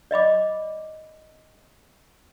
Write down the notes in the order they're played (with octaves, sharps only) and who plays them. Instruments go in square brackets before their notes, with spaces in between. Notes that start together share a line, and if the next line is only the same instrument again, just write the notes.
[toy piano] D5 D#5 B5 D6